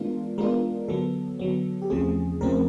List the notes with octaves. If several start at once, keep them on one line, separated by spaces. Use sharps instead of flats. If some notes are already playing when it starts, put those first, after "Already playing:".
Already playing: E3 G#3 B3 D4 F4 A#4
E3 G#3 B3 D4 F4 A#4
D3 F#3 B3 A4
D3 F#3 B3
G4
E2 C#3 F3 A3 C4 G#4
E2 C#3 F3 A3 C4 A#4